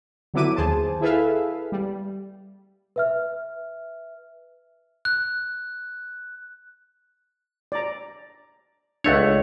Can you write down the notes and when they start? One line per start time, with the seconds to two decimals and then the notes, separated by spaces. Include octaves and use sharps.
0.34 D3 F#3 B3 E4 D6 D#7
0.56 D#2 G#4 C5 A5
1.01 E4 G#4 A4 B4 E5 F5
1.72 G3
2.96 B4 E5 F6
5.05 F#6
7.72 D5 A#5
9.04 C#2 A3 D4 C#5 E5 F#5